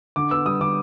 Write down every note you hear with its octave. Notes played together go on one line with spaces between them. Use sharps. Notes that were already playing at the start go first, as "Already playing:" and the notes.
D3 D6
B3 E6
G3 D#6
D3 D6